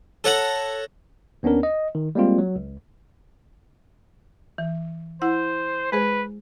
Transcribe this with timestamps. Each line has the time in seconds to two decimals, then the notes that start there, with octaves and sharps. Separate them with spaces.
0.24 A4 C#5 F#5 A#5
1.43 D#2 B3 C#4 D4 A#4
1.63 D#5
1.95 D#3
2.15 G3 G#3 A#3 C4 F4
2.38 F#3
2.56 C#2
4.58 E3
5.22 E4 C5 F#5
5.92 G#3 G#4 B4 C5